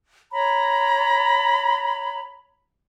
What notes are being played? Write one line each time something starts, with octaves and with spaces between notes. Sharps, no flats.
C#5 A#5 B5